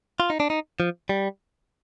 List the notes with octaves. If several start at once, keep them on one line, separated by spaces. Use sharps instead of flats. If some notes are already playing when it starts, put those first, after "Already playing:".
F4
D#4
D4
D#4
F3
G3